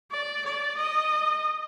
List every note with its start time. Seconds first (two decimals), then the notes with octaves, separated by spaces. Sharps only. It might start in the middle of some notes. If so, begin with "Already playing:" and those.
0.11 D5
0.45 D5
0.77 D#5